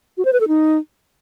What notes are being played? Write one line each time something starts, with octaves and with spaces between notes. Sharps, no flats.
F#4
C5
B4
A4
D#4